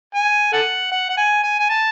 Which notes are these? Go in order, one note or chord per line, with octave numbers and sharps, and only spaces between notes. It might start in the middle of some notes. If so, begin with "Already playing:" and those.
G#5
A4 F#5
F#5
F#5
G#5
G#5
G#5
A5